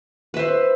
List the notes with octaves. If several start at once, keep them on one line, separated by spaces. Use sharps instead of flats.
B4 C5 E5